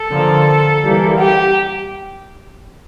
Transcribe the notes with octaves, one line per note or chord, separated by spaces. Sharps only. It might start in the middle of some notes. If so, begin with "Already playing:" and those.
Already playing: A4
D3 F3 A#3
E3 G3 A#3
G4